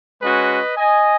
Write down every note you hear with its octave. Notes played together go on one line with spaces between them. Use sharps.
G#3 C#4 F#4 B4 D#5
D#5 G#5